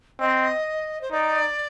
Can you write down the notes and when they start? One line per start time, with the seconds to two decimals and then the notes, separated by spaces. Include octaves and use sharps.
0.20 C4 D#5
1.01 C5
1.12 D#4 D5